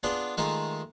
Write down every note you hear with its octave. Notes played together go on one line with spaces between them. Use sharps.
B3 D4 F4 G#4
D#3 G#3 A3 D#4 F4